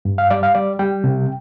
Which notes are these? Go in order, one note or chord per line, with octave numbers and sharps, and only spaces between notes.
G2
F5
G3 D5
F5
G3 D5
G3 G5
C3